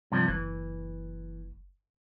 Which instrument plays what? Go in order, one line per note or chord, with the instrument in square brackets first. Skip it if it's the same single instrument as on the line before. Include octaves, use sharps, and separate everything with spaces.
[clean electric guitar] G2 C3 F3
[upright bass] F#1 [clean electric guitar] E3